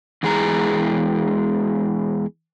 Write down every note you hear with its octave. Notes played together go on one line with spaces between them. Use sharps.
E2 E3 G#3 G#4 A5 A#5